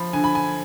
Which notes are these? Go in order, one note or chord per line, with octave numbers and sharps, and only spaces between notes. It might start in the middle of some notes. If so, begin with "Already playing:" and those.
Already playing: F3 B5
D3 G#5
B5
G#5